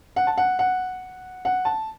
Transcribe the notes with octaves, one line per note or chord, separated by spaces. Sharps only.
F#5
A5
F#5
F#5
F#5
A5